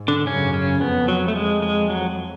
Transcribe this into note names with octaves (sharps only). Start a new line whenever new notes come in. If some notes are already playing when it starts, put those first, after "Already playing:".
Already playing: G#2
D3 D4
F#2 C#3 C#4
C#3 C#4
F2 B3
F#3
A3
G#3
G#3
F#3